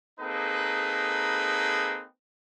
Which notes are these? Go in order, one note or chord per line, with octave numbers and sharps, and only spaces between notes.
A#3 C4 D#4 G#4 A4 B4